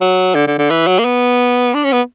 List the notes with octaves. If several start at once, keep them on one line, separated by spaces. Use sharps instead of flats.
F#3
D3
D3
D3
E3
F#3
A#3
B3
D4
C#4
B3